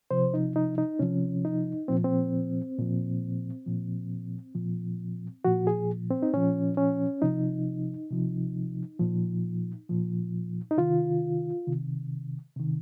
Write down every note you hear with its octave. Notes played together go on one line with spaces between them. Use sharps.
C3 F3 C5
D#4
D#4
D#4
C3 F3 C#4
D#4
A#2 F3 C4
C4
A#2 F3
A#2 F3
A#2 F3
A#2 F3 F#4
G#4
C4
D#4
A#2 F3 C#4
C#4
C3 F3 D#4
C3 F3
A#2 F3
A#2 F3
D#4
C3 D#3 F4
C3 D#3
C3 D#3